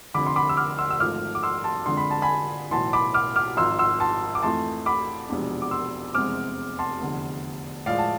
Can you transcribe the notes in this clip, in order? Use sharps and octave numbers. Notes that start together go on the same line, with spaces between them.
F1 F2 D3 B5 D6
C6
B5 D6
E6
D6 F6
C6 E6
E6
G#1 G#2 F3 A3 D6 F6
D6
C6 E6
A5 C6
F2 D3 G#3 D4 C6
B5
A5
G#5 B5
B1 A2 E3 A5 C6
B5 D6
D6 F6
D6 F6
G#1 G#2 F3 C6 E6
C6 E6
A5 C6
D6
F2 E3 A3 A5 C6
B5 D6
F1 E2 B2 G#3 D4
D6
C6 E6
F1 E2 C3 G#3 C4 D6 F6
A5 C6
F1 E2 D3
A2 F3 G#3 D5 F5
A5